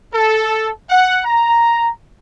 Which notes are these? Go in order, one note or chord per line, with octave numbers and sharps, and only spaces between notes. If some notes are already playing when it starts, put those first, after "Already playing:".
A4
F#5
A#5